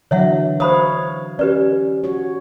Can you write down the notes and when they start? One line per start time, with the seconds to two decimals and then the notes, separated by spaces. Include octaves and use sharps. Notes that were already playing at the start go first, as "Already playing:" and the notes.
0.11 D3 E3 F#3 C#5 E5 F#5
0.60 C5 C#5 F5 B5 D#6
1.39 C#4 G4 B4 D5
2.04 F#4 C#5